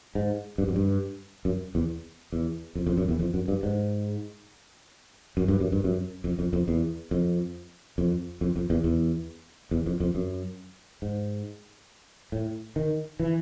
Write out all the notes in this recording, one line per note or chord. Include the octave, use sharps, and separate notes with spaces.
G#2
G2
F#2
G2
F#2
E2
E2
F2
F2
F#2
E2
F2
F#2
G2
G#2
F#2
G2
F#2
G2
F#2
F2
F2
F2
E2
F2
F2
F2
F2
E2
E2
E2
F2
F2
F#2
G#2
A2
D#3
E3